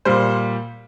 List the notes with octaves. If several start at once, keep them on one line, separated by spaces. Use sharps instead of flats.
A#2 G3 C5